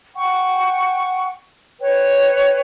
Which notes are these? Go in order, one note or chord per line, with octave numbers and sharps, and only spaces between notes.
F#5 G5 C#6
B4 C#5 G5